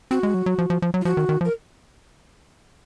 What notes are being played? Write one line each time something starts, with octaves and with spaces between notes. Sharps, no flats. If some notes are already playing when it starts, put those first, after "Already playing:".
C4 F#4
G#3
F#3
F#3
F3
F3
F3
F#3
F4
F3 F#4
D#3
D#3
F3
A#4